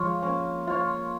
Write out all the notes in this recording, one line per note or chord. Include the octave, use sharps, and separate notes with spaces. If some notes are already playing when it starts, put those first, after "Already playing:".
Already playing: F3 G#3 F4 C#5
A#3 C#4
A#3 F4 C#5